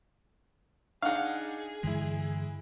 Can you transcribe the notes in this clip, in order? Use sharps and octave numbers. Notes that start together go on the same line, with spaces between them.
D4 D#4 G#4 F5 F#5
G2 D3 E3 G#3 E4